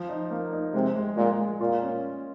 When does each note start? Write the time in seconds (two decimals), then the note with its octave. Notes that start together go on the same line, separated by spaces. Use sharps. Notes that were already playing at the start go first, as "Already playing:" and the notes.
Already playing: F3
0.09 D#4
0.30 A#3
0.52 D#4
0.73 C3 G#3
0.96 G#3
1.17 A#2 G#3
1.39 G#3
1.60 A#2 F4
1.82 C#4